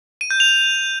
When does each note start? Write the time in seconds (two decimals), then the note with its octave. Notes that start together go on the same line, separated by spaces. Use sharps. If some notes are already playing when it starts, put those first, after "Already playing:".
0.21 D#7
0.31 G6
0.40 F7